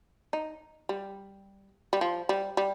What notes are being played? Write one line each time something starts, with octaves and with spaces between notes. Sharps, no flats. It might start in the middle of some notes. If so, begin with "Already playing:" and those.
D#4
G3
G3
F3
G3
G3